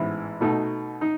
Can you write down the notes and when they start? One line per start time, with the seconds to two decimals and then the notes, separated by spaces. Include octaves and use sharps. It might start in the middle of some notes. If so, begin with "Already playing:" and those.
Already playing: A1 G#2 E3 B3 E4
0.41 B2 A3 D#4
1.01 D#4